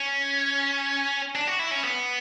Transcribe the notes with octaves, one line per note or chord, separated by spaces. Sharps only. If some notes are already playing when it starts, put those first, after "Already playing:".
Already playing: C#4
D4
F#4
E4
C#4
B3